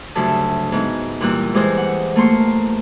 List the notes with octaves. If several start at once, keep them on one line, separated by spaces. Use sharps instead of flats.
D2 G2 C#3 F#3 E5 A5
G#2 B3
E2 A#2 E3 G3 E6 F#6
E3 G3 G#3 G#4 C5
F#5
A3 A#3 C6 C#6